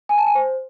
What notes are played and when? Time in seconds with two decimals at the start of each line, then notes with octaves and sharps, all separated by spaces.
0.09 G#5
0.18 A5
0.27 G#5
0.35 C5